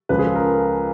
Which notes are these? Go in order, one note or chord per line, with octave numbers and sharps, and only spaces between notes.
C#2 C#3 F3 B4
G#4
A4
A#4